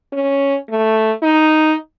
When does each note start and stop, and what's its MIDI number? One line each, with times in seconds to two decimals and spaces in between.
0.13 0.56 61
0.70 1.12 57
1.22 1.75 63